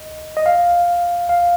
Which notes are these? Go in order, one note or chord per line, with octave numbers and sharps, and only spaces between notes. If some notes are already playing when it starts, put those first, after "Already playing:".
Already playing: D#5
D#5
F5
F5